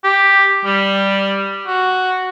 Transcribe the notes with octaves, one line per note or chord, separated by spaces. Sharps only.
G4
G3
F#4